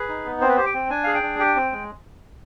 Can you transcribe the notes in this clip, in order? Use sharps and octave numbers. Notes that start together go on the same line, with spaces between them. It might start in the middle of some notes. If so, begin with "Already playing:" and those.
Already playing: G#4 B4
D#4
B3
C4 C5
B4
G4 C5
G5
C4
D4 G#5
G#4 F5
G5
D4
G4 G5
C4
G#3